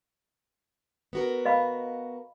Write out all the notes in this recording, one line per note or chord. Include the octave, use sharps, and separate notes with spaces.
B3 F#4 A#4
D#5 F5 B5